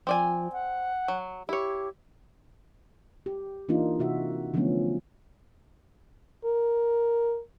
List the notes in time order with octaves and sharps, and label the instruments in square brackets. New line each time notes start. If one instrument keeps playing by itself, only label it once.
[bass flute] F3 [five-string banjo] C4 D5 G#5
[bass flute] F#5
[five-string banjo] F#3
[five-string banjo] E4 C#5 [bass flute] G4
[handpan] G4
E3 A#3 D4 D#4 F4
C3 F#4 E5
D3 F3 F#3 A3 B3 C#4
[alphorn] A#4